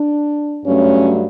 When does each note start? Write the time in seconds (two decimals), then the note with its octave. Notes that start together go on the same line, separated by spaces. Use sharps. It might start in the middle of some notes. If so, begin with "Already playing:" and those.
Already playing: D4
0.64 G2 F#3 A3 C#4